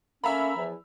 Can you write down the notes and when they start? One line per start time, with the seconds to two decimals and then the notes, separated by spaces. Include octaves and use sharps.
0.24 A3 A#3 C#4 E5 A#5 B5
0.56 E2 F3